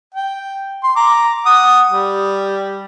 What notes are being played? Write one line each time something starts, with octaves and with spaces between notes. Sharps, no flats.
G5
C6
A#5 D6
F#5 D#6
G3